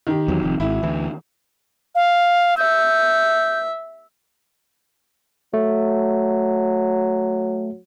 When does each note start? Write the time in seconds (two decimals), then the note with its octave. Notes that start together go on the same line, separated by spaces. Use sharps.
0.07 D#3 G4
0.28 E2 F#3
0.42 F1 F2
0.60 G#1 E4
0.83 D2 E3
1.95 F5
2.57 E5 G6
5.54 F#3 A3